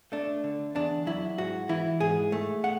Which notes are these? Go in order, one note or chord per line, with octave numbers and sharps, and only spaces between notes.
A3 D4
D3
E2 D4
F#3 E4
G#2 F#4
E3 E4
G#2 G#4
A3
F#5